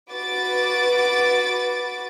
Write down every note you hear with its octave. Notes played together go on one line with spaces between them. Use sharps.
F#4 B4 D6 A6